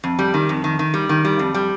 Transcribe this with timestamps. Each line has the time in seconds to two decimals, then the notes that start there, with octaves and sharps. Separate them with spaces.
0.04 F2
0.19 G3
0.34 D#3
0.49 F2
0.64 D#3
0.79 D#3
0.94 G3
1.09 D#3
1.25 G3
1.39 F2
1.54 G3